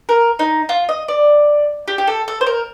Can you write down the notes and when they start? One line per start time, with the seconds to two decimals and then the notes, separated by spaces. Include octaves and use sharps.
0.09 A#4
0.39 D#4
0.69 F4
0.89 D#5
1.08 D5
1.88 G4
1.98 G4
2.07 A4
2.28 A4
2.41 C5
2.47 A#4